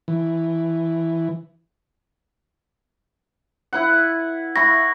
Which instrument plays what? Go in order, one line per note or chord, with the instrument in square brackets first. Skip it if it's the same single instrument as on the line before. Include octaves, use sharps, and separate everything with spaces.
[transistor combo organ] E3
[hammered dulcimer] E4 B4 F#5
[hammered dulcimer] E4 B5 C#6 [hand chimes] A#6